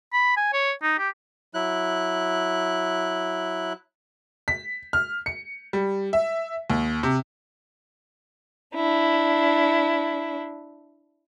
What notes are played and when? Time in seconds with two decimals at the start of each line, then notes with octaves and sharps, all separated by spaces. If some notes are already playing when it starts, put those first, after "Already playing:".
0.13 B5
0.37 G#5
0.53 C#5
0.83 D#4
0.99 G4
1.54 F#3 E4 F#6
4.48 B6
4.93 F6
5.26 C#7
5.73 G3
6.13 E5
6.70 D#2
7.03 C3
8.75 D4 E4